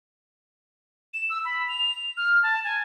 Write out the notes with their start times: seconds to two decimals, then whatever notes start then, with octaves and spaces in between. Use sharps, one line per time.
1.14 E7
1.30 E6
1.45 B5
1.68 F7
2.17 F6
2.43 A5
2.64 G#5